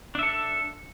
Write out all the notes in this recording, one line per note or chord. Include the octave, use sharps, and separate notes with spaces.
D4 A4 E5